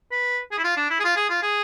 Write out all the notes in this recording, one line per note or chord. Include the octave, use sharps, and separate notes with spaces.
B4
G#4
E4
F4
D4
E4
G#4
F4
G#4
F4
G#4